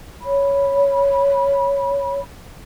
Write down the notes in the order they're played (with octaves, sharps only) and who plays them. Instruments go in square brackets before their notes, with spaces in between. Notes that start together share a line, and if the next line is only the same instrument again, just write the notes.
[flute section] C#5 B5